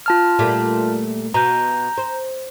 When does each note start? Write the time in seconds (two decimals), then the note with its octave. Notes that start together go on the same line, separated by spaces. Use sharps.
0.06 F4 A5 F6
0.39 A#2 G3 A3
1.34 B2 A#5 G6
1.98 C5